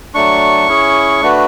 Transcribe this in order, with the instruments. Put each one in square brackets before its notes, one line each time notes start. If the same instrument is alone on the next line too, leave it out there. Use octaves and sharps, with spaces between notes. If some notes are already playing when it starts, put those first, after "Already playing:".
[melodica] F#3 A3 D4 [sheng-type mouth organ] C#6
[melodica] C#4 E4 G#4
A3 D4 F#4 B4